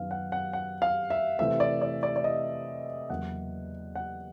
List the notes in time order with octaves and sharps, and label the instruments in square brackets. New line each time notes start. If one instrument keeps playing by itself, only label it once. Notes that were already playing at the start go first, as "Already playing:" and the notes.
Already playing: [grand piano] F#2 D#3 F#3 B3 F5
F#5
F#5
F#5
F5
E5
C3 E3 A3 C4 E5
D5
D5
D5
D5
D#5
E2 C#3 F#3 A#3 F#5
F#5